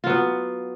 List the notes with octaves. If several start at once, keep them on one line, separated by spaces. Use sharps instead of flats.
F#3 B3 F4